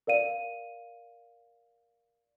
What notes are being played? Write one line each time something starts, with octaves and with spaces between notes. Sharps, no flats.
A#4 D5 F5 D#7